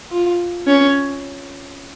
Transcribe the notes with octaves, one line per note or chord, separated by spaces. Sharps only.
F4
C#4